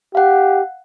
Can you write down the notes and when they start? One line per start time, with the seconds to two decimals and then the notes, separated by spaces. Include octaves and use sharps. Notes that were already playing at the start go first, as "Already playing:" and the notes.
0.15 G4 F5 F#5